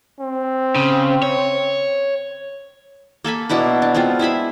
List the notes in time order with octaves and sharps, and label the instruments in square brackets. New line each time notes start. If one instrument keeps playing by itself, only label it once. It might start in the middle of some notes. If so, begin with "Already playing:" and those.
[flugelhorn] C4
[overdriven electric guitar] C#3
C#5
[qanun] A#3 A4 G#5 B5
B2 D4 E4 B4
D4
G#3 B3 C4 F4
E4 G#4 E5 B5